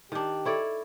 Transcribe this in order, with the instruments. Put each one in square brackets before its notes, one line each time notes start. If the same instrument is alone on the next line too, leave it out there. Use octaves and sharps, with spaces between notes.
[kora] D#3 D4 [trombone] G4
[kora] E4 C#5 D5 [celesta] A4